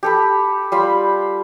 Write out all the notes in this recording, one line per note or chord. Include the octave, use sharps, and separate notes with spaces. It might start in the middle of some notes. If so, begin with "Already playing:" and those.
G4 A4 B5
G3 F4 B5